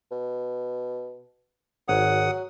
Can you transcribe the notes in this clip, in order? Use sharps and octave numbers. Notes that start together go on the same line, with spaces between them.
B2
G#1 F#3 C#5 F#5 D#6